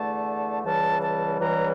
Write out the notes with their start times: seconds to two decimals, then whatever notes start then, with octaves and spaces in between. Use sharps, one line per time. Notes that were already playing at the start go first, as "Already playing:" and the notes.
Already playing: E2 D3 A3 A5
0.64 C#2 C#3 E3 G3 A5
1.02 A5
1.40 C#2 C#3 E3 G3 A#5